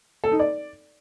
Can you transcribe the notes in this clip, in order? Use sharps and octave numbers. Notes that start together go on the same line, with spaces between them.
A4
D#4
D5